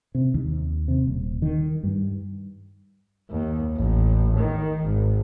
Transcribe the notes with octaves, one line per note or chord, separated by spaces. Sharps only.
C3
D#2
C3
D#1
D#3
G2
D#2
A1
D#3
G#1